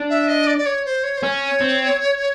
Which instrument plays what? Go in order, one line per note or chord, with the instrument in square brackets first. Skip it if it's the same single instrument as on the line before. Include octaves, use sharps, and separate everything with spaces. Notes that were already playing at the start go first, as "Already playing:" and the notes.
Already playing: [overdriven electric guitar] D4
[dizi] E5
D#5
D5
D5
C#5
C5
C#5
C5
[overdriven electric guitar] C#4 [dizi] C#5
[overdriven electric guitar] C4